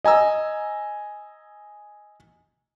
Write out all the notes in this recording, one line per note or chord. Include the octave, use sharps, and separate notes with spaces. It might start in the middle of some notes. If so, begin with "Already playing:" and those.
D#5 G#5 A#5 E6